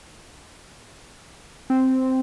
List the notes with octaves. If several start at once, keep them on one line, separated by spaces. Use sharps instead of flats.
C4